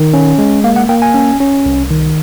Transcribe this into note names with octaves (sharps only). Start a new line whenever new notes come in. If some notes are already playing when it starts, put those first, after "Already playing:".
Already playing: D#3
C#4
G#3
A#3 F5
F#5
A#3 G5
G#5
C#4
C#4
C2
D#3